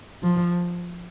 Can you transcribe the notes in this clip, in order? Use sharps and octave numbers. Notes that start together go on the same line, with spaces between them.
F3